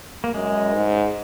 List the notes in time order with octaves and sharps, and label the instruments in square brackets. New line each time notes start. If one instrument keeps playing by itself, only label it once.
[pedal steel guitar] A#3
[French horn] F#2 [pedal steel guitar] G#3
[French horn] G#2